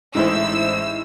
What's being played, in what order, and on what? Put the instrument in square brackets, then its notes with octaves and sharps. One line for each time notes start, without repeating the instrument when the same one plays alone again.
[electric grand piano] A1 A2 G#3 [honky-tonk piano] D#4 E4 C5 [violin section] E6